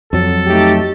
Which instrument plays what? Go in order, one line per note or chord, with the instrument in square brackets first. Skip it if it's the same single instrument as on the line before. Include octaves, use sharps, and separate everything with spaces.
[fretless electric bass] F2 F#3 [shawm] A4
[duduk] A3 [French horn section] D#4 G4